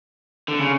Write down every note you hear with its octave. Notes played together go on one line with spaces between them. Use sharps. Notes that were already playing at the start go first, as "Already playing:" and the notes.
D3
C#3